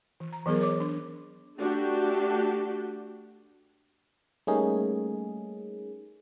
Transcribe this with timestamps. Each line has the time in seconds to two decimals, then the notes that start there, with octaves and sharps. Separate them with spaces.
0.20 E3
0.33 A#5
0.46 E3 F#3 B3 G#4 A#4
0.61 C#5 D6
0.80 D4
1.56 A3 D4 F#4 G4
4.47 G3 A3 A#3 C#4 D#4 G#4